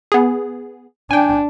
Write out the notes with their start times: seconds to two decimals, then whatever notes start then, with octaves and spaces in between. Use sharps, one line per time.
0.12 B3 G#4
1.11 D4 G5 G#5